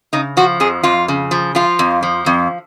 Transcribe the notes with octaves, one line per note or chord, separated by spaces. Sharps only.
C#3 D#4
F3 F#4
F2 G#4
F2 F4
C#3
F3
F3 F4
F2
F3
F2